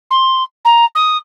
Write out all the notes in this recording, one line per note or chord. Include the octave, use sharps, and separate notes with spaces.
C6
A#5
D#6